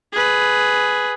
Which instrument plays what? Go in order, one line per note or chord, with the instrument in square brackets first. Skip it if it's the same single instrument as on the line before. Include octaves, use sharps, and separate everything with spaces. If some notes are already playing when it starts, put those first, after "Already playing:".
[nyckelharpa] G#4 B4